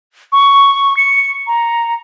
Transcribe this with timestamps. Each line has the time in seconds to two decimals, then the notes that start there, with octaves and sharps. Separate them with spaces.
0.32 C#6
0.97 C#7
1.47 A#5